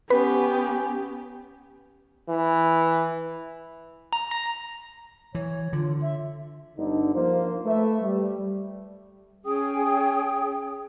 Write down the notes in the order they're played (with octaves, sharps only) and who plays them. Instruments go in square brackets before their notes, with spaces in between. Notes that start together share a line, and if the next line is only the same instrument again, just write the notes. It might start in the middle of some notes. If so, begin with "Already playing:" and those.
[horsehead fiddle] B3 G4 [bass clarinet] C#4 [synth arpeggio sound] B4
[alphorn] E3
[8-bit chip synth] A#5
[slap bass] E3 [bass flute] C#5
[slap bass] D3 [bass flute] F4
[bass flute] E5
[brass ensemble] G1 D3 D4 D#4
F3 A#3 F4 C5
A3 B4 E5
G3
[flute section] C#4 G#4 G5 D#6